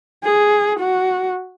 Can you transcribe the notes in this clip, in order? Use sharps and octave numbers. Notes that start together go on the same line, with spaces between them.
G#4
F#4